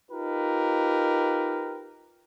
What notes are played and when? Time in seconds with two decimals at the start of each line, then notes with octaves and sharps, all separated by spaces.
0.11 D#4 F4 G4 A#4 B4